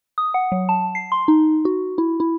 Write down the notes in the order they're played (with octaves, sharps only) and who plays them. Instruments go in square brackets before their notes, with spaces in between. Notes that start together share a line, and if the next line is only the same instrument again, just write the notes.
[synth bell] D#6
F#5
F#3
A5
C7
C6
D#4
F#4
E4
E4